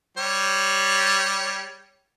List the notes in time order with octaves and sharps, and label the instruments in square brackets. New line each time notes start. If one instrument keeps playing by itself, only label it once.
[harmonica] G3 C#5